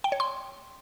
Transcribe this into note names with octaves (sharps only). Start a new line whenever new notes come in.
G5
C#5
C6